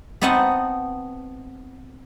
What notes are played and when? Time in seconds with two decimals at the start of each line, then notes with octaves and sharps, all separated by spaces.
0.21 B3 C4 D#4 D#5 F#5 A5